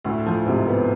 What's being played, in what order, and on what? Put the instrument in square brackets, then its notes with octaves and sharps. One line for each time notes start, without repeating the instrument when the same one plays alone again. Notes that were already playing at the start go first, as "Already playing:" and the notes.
[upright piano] D2 [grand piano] A2
[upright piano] F3
[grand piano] G#2 [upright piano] C3
[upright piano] B3